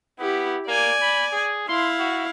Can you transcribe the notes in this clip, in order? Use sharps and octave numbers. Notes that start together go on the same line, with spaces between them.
B3 E4 G4
A#3 D5 G#5
B5
G#4
E4 F5 C6
F#4